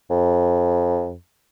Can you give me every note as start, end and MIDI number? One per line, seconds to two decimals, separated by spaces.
0.10 1.14 41